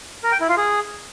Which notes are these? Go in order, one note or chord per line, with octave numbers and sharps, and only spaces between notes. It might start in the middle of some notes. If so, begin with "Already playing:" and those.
A#4
G5
E4
F4
G#4